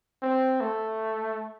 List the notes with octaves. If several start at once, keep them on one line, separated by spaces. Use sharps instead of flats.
C4
A3